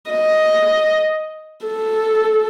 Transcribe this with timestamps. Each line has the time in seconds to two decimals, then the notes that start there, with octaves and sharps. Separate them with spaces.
0.11 D#5
1.66 A4